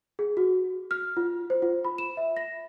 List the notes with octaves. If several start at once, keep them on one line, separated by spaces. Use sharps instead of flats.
G#4
F#4
F6
F4
C5
F4
B5
E7
E5
A#6